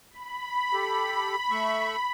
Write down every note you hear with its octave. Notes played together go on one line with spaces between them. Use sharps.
B5
G4 A4
A3 E5 C#6